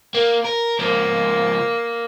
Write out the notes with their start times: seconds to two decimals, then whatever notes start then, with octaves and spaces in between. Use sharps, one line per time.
0.14 A#3
0.44 A#4
0.79 C#2 F3 A#3